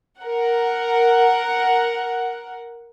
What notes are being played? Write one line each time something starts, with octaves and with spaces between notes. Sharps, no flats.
A#4 F#5